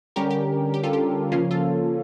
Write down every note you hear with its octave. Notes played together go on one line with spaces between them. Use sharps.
D3 G3 C#4 G4 A#4
G4
G4
F4 A4
G4
C#3 F3 A#3 C#4 F4
F4 A4